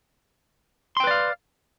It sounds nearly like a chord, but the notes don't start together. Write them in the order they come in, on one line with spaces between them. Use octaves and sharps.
C6 G5 B4 D5 F5